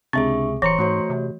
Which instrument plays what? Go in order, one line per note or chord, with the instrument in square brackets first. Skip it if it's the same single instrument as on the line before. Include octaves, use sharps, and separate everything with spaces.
[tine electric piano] C#2 C3 [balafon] C4 [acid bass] D4 [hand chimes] G#4 E5 C#6
[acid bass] D1 [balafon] E3 [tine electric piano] C5 A#5 C#7 [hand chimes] C6 C#6
[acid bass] G#2 [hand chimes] A3 F#4 C#5
[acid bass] C3